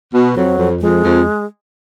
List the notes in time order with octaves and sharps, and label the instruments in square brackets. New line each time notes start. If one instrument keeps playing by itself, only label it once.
[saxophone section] B2
[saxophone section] F2 [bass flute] F#3
[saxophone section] F2
[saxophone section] F2 [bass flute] G#3
[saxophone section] F2